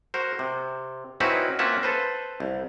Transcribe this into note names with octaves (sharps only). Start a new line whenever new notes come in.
F#4 A#4 C5
C3
C4 C#4 D#4 E4 F#4 B4
A#3 C4 C#4 F4 E5 F#5
A4 B4 C5
C2